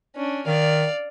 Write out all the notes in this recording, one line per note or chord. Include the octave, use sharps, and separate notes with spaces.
C#4 D4
D#3 D5 F5